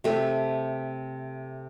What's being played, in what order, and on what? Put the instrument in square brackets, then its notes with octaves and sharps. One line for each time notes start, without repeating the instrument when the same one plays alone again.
[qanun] C3 A3